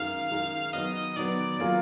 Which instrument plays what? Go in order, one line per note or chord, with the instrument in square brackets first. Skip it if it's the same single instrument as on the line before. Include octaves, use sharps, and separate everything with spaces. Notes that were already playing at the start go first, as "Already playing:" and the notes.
Already playing: [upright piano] F#2 D#3 G#3 D#4 A#4 [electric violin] F5
[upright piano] F#2 D#3 G#3 D#4 A#4
[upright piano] D#3 F#3 B3 [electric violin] D#5
[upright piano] D#3 F#3 B3 [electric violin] D5
[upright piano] F#3 A#3 F4 G#4